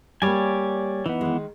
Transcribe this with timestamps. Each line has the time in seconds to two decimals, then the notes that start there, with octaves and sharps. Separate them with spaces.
0.22 G3 A#3 C#5 D5 G#5
1.06 E3 B3 D#4
1.21 D#3 G#3